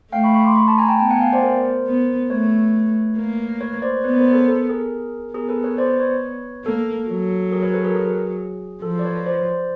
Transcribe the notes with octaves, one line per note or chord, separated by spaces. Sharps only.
A3 F5 G5
B5 C#6
B5 C#6
C6 D6
B5 C#6
A5 B5
G#5 A#5
G5 A5
B3 G5 A5
F#5 G#5
F5 G5
C5 D5
A#4 C5
B3
A3 B4 C#5
A#3
B4 C#5
C#5
C5 D5
D5
B3 B4 C#5
A#4 C5
A4 B4
A4
G#4 A#4
B3 G#4 A#4
A4 B4
B4 C#5
C5 D5
B4 C#5
A#3 A4
F#3
G#4 A#4
B4 C#5
A4 B4
G#4 A#4
G#4
F3 A4
D5
B4 C#5
C5 D5